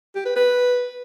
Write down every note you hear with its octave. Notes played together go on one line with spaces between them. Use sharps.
G4
B4
B4